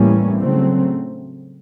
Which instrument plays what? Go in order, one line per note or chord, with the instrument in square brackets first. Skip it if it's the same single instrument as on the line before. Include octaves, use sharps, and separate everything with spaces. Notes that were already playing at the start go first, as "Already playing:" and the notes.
Already playing: [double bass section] A2 E3 G3 A#3 C#4
C#3 F#3 A3 C4